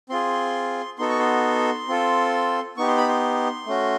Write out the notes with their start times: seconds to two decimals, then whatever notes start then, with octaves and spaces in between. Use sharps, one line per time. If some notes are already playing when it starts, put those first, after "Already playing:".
0.09 C4 F4 G#4 C6
0.98 B3 D#4 F#4 A4 C6
1.09 C#6
1.19 C6
1.88 C4 F4 A4
2.77 B3 D#4 G4 C#6
2.87 C6
2.98 B5
3.09 C6
3.66 A3 C#4 F#4